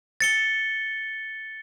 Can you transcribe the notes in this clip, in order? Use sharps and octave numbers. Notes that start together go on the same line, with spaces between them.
A6 C#7 G7